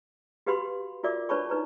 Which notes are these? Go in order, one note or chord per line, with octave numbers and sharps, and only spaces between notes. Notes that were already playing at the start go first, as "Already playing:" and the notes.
F#4 G4 B4 F5 B5 C6
F4 F#4 A#4 D5 E5 D6
D4 B4 C#5 A5 B5 C#6
D#4 B4 A#5